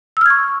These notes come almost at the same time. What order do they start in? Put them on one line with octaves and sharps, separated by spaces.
E6 F6 G#6 C#6